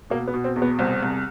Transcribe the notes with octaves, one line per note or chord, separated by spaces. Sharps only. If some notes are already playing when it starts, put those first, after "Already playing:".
B2 A#3
B3
B2
C4
E2
B3
C2 C4
C2